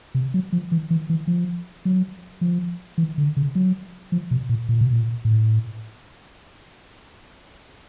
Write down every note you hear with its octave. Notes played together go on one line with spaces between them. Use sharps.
C3
F#3
F3
E3
E3
E3
F3
F#3
F3
E3
D3
C#3
F#3
F3
B2
A#2
A#2
B2
A#2
A2